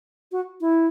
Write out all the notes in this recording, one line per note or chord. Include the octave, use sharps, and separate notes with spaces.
F#4
E4